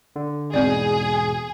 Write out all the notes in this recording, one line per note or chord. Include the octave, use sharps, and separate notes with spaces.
D3
E2 G#2 B2 C4 G#4 D5